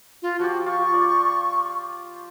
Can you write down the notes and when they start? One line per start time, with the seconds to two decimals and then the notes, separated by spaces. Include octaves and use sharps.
0.22 F4
0.39 F3 F#4 G4
0.66 F4 C#6
0.94 D5